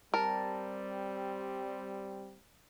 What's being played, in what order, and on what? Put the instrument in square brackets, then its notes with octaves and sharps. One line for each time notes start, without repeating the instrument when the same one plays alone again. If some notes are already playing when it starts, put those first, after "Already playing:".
[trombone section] G3 C4 [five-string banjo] A#4 [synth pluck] A5